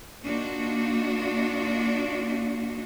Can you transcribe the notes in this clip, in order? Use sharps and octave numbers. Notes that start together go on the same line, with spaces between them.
A#3 D4 D#4 F4 F#4